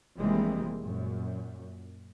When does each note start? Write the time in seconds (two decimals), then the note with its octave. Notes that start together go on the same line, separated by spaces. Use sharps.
0.18 F1 E3 G3 G#3 A#3 C4
0.79 F#2 A#2